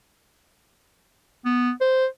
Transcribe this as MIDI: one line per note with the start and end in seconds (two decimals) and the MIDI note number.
1.45 1.71 59
1.81 2.06 72